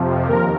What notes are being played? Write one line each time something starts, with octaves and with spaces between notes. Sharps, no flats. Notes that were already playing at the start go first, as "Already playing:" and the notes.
Already playing: F2 C3 F3
D#2 A#4